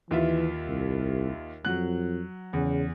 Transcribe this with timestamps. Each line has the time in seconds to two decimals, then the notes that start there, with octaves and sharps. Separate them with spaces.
0.11 D#2 E3 F4 E5
0.68 C2
1.65 F2 F#3 F#6
2.53 E2 C#3